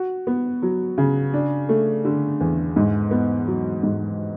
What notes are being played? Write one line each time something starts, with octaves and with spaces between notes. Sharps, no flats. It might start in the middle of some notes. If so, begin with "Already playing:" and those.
Already playing: F#4
B3
F#3
C#3
D4
A3
D3
E2
G#2
B3
F#3
G#2